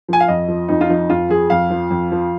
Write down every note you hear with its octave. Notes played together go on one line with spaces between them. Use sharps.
F3 G#5
F5
F2 D#5
F3
F2 D#4
F4
F3 D#4
F2 F4
F3 G#4
F2 F5
F3
F2
F3